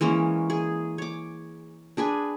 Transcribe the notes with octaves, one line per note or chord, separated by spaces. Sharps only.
E3 G#3 A#3 C#4
G#4
C#5 D6
D4 G#4 B4 G#5